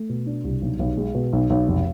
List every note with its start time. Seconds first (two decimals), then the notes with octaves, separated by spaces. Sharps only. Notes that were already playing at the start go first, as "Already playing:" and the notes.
Already playing: A3
0.09 B2
0.26 D4
0.44 C2
0.62 B1
0.79 B1
0.97 G#3
1.15 B2
1.33 B1
1.50 B1
1.68 F1